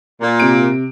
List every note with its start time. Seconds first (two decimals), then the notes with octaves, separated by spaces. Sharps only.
0.21 A#2
0.40 C3 D7